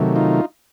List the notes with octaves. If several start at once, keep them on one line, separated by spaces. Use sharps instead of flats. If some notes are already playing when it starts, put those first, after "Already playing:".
Already playing: C3 D#3 F#3 A3
D#4 F4